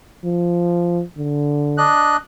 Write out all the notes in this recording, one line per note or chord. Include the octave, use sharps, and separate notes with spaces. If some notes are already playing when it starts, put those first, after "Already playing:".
F3
D3
D4 D#5 F#6